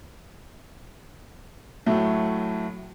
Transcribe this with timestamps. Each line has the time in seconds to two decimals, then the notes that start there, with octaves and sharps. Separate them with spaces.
1.86 A2 F#3 A3